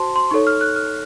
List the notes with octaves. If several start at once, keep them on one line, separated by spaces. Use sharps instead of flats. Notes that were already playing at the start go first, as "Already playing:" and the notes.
Already playing: F#4 C5 A5 C6
C6
D#4 A4 C#5 C#6
F6
F#6
F6